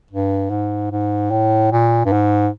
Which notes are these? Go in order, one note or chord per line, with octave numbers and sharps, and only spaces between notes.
G2
G#2
G#2
A2
A#2
G2
G#2